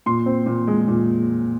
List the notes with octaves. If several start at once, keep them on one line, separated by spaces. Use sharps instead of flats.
A#2 C6
C4
A#2
G#3
A#2